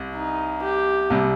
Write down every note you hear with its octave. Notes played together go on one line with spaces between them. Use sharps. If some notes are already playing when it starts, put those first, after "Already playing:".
Already playing: C2
D#4
G4
C2 C3 G3